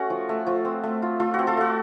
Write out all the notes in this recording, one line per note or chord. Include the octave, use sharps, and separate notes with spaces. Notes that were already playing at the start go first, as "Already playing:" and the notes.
Already playing: A3 C#4 F#4
F3
A3
F3
C4
A3
F4
A3 F4
F#4
C4
F4 A4
A3 F#4